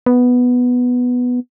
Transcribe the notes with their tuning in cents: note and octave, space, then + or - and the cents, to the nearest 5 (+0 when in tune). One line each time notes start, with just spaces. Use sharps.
B3 +0